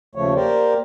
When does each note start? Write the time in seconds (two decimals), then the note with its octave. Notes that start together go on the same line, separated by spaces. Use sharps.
0.15 D#2 C#3 F3 A3 C#5
0.35 A#3 G4 A#4 C5 D5